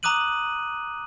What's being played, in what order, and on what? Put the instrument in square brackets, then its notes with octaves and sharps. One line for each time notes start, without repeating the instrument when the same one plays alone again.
[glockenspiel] A#5 D6 D#6 F#6 D#7 F#7